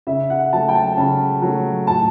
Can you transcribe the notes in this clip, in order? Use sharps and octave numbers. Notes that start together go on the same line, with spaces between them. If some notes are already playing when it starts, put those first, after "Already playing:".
C#3 E5
F#5
F#3 A3 A5
G5
A5
C#3 A5
F#3 A3
A2 A5